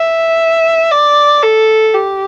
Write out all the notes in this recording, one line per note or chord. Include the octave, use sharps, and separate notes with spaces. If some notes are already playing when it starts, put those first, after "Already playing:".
Already playing: E5
D5
A4
G4